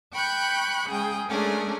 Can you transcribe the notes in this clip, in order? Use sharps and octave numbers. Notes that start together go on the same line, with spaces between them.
G5 B5 C#6 F#6 G6
C#3 G#3 G#4 G5
G#3 A3 C#4 D4 G#4 A#4